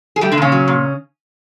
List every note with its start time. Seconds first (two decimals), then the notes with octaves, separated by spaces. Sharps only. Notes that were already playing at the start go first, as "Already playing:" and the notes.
0.16 G#4
0.21 G3 A3 G4
0.32 D3 D4
0.38 A#2 C#3 C#4
0.52 F#3
0.68 A#2